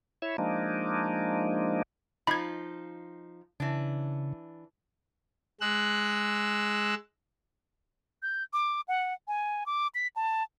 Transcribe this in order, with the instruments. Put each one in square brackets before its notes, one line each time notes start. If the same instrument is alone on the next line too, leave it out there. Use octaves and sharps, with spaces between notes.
[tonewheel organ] E4 C#5 E5
F3 G#3 A#3 D4 D#4
[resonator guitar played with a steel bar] F3 D#4 F4 [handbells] B5 G#6
[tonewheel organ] C#3 [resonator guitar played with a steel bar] E3 D4
[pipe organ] G#3 E6 F#6
[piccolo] G6
D6
F#5
G#5
D6
B6
A5